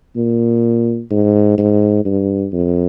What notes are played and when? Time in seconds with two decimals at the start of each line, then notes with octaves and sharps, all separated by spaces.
0.16 A#2
1.11 G#2
1.58 G#2
2.05 G2
2.52 F2